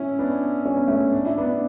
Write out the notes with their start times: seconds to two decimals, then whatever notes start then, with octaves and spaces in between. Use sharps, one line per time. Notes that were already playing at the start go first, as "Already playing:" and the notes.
Already playing: C#4 E4
0.19 B3 D4
0.66 C#4
0.77 B3
0.88 A3 C#4
1.13 D4
1.25 E4
1.38 B3 D4